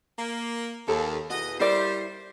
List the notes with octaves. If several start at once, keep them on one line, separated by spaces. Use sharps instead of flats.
A#3
D#2 A4
E2 B2 F#4 D#5
G3 E4 A#4 C5 D5